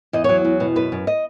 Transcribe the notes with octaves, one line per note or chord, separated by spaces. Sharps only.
E2 D#5
F#3 C#5
E2
B2
F#2 B4
F#2
D#5